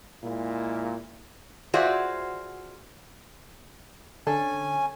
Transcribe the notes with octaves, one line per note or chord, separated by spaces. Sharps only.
A#2 G#3 A#3 E4
F4 F#4 G#4 C5 D5 E5
D3 C#4 A4 G#5